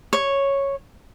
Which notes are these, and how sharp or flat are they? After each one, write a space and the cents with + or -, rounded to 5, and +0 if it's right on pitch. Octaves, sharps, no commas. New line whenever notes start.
C#5 -5